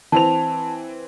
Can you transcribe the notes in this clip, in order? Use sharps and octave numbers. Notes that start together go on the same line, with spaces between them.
E3 C4 A5 F7